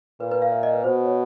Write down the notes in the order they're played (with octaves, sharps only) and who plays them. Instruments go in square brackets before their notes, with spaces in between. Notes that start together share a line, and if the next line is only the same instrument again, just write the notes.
[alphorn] A#2 [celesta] B4
[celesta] B4
F5
E5
D#5
B4
[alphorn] B2 [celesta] C5
[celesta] C5
C#5